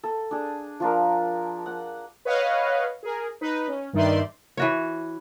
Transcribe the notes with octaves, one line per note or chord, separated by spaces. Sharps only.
A4
D4 G#4
F3 D4 A#4
F#5
B4 C#5 D#5 F5 F#5
G#4 A#4
D#4 B4
C#4
G2 D#3 D#4 D5 E5 C6
E3 F#4 C#5